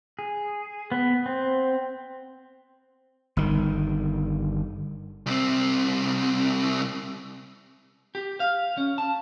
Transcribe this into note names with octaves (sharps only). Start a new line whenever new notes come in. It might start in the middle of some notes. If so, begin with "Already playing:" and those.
G#4
B3
C4
G1 D#3
C2 C4
G4
F5
C#4
A5